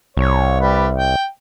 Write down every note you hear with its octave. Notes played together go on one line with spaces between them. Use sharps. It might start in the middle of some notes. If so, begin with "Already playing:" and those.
C2 C#5
G3 G4 B4
G5